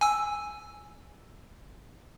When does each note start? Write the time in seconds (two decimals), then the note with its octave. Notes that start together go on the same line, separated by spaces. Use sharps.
0.01 G#5 E6